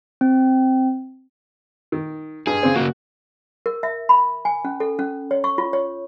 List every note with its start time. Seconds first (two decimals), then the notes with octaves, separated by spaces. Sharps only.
0.21 C4
1.92 D#3
2.47 G2 G#4
2.63 C#3 C4
2.76 C#3 A#3 F#4
3.66 A#4
3.83 E5
4.09 B5
4.45 G#5
4.65 C#4
4.80 A4
4.99 C#4
5.31 C#5
5.44 C#6
5.58 F4
5.73 C#5